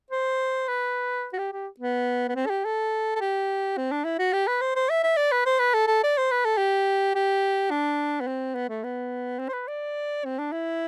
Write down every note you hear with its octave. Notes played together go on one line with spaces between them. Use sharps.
C5
B4
F#4
G4
G4
B3
B3
C4
A4
G4
A4
A4
G4
C4
D4
E4
F#4
G4
B4
C5
C5
E5
E5
D5
B4
C5
B4
A4
A4
D5
C5
B4
A4
G4
G4
D4
B3
C4
B3
A3
B3
C4
C5
B4
D5
C4
D4
E4